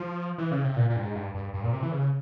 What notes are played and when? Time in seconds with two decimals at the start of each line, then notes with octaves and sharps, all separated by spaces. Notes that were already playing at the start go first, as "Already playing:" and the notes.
Already playing: F3
0.38 E3
0.51 C#3
0.64 C3
0.76 A#2
0.90 A#2
0.96 G2
1.03 G#2
1.15 G2
1.34 G2
1.54 G2
1.63 A#2
1.73 C3
1.82 E3
1.92 C#3